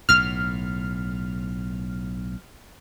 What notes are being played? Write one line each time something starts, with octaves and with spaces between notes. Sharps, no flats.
B1 A2 F6